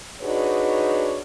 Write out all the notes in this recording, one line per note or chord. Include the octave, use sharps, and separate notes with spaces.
D4 D#4 F#4 G#4 B4 C#5